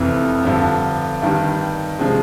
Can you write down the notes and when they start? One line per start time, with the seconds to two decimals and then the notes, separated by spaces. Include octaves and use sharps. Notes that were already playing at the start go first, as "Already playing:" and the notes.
Already playing: F1 F2 C3 E3
0.44 G2 D3 F3
1.22 G2 D#3 G3
1.99 C3 F3 G#3